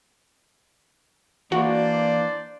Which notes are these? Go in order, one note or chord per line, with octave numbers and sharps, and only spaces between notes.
E3 A#3 D4 F#4 C5 D5